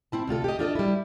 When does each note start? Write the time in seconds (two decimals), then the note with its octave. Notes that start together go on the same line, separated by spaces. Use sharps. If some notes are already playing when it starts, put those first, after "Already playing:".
0.12 C4 E4 A5
0.27 D2 C3 F4 A4
0.44 G4 D#5
0.59 D4 F4 A4 D#5
0.75 G3 E4